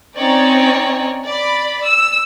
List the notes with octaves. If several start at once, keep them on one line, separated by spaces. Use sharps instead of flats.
C4 C#4 D#4 C#5 D5
D5 B5
E6